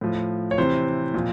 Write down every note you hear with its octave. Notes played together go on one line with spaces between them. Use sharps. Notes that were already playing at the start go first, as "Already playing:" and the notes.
A2 F3
C#5
C3 E3 C5
A#2 F3